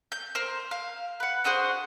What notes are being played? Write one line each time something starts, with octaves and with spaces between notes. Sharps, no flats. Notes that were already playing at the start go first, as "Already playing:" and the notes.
G6
A#4 C5
F5
B4 F#5
D4 F#4 G#4 C5